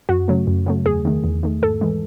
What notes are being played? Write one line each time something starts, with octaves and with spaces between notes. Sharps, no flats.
F#2 F#4
C#3 F#3 A3
F#2
C#3 F#3 A3
E2 G#4
D#3 A3
E2
D#3 A3
G#2 A4
E3 G#3